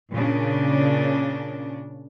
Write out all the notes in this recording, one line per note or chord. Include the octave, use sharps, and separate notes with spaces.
A#2 C#3 D4